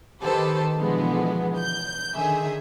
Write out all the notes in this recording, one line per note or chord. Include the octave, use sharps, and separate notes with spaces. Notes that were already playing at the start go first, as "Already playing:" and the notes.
D#3 G4 A4 B4 C5
B2 D3 E3 F3 G#3 B3
G6
D3 D#3 G#4 E5